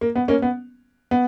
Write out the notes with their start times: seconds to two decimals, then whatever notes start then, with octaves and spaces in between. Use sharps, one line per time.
0.01 A#3
0.16 B3
0.28 A#3 C#4
0.42 B3
1.11 B3